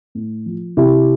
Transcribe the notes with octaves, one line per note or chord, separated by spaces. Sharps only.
A2
F3
C3 E4 G4